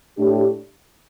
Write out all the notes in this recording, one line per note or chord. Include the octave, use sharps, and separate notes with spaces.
A2 A3 D4 G4